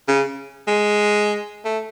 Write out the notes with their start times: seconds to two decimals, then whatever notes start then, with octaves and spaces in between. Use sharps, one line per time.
0.08 C#3
0.67 G#3
1.65 A3